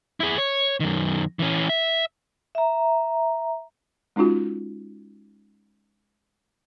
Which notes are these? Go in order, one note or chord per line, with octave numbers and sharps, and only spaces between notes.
E4 G#4
C#5
F#2 D#3
E3 C#4
E5
E5 A#5
G#3 C#4 D#4 F4 F#4